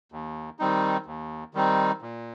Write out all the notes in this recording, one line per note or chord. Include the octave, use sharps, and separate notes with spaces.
D#2
D#3 G3 C4 D#4
D#2
D#3 G3 C4 D#4
A#2